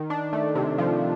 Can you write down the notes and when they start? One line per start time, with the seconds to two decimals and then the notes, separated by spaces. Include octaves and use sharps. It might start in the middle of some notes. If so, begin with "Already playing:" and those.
Already playing: D#3
0.10 D4
0.33 A3
0.55 C3
0.78 F3